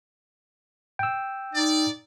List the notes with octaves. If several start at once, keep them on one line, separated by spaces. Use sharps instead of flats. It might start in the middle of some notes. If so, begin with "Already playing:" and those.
G5 E6
D#4 D5